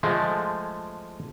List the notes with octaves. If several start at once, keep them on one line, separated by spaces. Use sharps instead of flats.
F3 G#3 A3